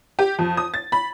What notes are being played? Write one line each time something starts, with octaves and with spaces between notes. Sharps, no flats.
G4
F2
D#6
A6
B5